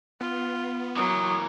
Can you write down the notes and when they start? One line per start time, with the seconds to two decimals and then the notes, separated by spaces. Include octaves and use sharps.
0.21 B3 F4
0.96 E3 F#3 A#3 D#6